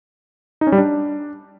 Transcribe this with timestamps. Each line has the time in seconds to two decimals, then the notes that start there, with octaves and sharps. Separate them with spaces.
0.61 D#4
0.67 C#4
0.72 G3
0.78 D4